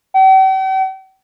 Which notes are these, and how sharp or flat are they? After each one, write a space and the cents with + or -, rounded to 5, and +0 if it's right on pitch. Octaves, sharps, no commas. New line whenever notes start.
G5 -45